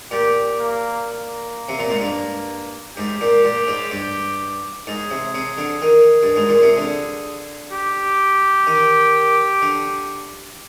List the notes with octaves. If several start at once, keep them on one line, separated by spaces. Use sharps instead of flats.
A#2 G4
A#3
A#3
C3
A#2
G#2
G2
G#2 G4
A#2
A#2
G#2
G2
G#2 G#4
C3
C3
D3
D#3
G2
G#2
A#2
C3
D3
G4
D#3
D3